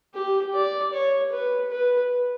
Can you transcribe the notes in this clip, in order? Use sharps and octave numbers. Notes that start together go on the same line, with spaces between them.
G4
D5
C#5
B4
B4